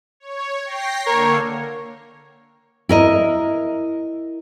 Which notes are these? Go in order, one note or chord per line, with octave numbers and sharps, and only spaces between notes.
C#5
G5 A#6 C7
D3 A#3 A#4 C#5
E4 A#4 D#5